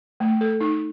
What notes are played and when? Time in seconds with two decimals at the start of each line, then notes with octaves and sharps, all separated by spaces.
0.20 A3
0.41 A4
0.61 D#4